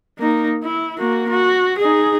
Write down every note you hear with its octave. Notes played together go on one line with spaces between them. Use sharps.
A#3 D#4
E4
A#3 F#4
F#4
D#4 G#4